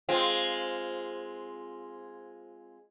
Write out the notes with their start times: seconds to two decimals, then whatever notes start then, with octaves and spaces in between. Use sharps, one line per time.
0.09 G#3 C4 F4